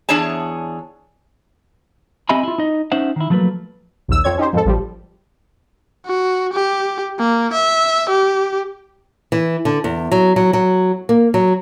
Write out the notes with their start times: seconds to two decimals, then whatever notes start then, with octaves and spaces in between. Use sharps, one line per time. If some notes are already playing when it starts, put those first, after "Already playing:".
0.09 E2 D4 G#4 C#5 A5
2.29 C4 G4 D#5 E5 G#5 B5
2.43 E4 F4
2.58 D#4 D#5
2.92 C#4 D#4 C5 E5 F#5
3.16 D#3 E4
3.30 F3 F#3 A3 A#3 B4
4.08 A#1 D#2 E6
4.24 F2 C4 C#5 G#6
4.38 C#4 D#4 G4 C5
4.53 F2 G#2 A4
4.65 A1 F3 G3
6.06 F#4
6.53 G4
7.19 A#3
7.53 E5
8.09 G4
9.32 E3
9.65 D3
9.84 E2
10.12 F#3
10.36 F#3
10.53 F#3
11.09 A#3
11.34 F#3